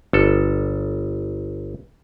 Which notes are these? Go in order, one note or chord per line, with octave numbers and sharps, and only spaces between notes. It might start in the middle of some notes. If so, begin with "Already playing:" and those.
G1 A4